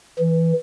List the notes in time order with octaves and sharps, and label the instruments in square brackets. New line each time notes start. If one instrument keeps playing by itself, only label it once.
[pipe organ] E3